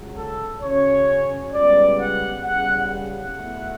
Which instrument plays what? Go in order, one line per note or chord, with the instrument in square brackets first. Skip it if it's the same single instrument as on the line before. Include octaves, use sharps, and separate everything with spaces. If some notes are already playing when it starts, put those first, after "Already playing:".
Already playing: [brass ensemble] C#2 C#3 F#3
A4
C#3 F#3 C#4 C#5
C#2 C#3 G3 B3 D5
F#5
E2 C#3 G3 F#5
F#5
E2 B2 A3 E4